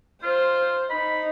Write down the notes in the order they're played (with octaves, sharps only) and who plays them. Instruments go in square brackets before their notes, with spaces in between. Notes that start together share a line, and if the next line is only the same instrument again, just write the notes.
[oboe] F4 [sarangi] C5
[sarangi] D#4 [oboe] B5